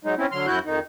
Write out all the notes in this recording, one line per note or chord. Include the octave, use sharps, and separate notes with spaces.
F#3 G#3 D#4
C4 C#4 E4
D3 F#3 C6 F6
F#2 E4 F#4 F#6 G6
F2 D#3 D#4